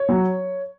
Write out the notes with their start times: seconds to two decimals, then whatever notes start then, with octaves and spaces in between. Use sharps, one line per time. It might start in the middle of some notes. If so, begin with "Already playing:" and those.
Already playing: C#5
0.09 F#3